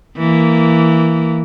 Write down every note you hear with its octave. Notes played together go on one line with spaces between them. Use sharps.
E3 A#3